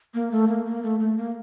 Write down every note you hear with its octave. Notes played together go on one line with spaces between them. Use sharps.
A#3
A3
A#3
A#3
A3
A3
A#3